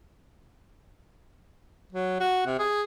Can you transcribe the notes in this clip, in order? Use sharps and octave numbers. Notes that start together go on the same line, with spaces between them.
F#3
F#4
C3
G#4